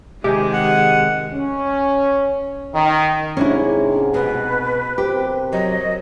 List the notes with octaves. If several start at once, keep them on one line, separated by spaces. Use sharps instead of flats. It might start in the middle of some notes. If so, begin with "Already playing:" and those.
C3 D#3 G#3 D#4 G4 G#4
F#5
C#4
D#3
G#2 C3 C#4 D4 E4
B2 B4
C3 G4 A#4 C5
F#3 D#5